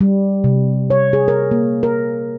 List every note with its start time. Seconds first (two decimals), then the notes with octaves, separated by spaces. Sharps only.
0.01 G3
0.44 C3
0.90 C#5
1.13 G#4
1.28 A#4
1.51 A#3
1.83 A#4